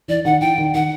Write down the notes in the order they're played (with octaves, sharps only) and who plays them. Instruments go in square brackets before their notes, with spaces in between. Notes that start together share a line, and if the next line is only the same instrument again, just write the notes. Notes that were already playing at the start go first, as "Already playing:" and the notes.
[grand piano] E3 [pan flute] D5
[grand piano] D#3 [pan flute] F#5
[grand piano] E3 [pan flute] G5
[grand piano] D#3
[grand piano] D#3 [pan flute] F#5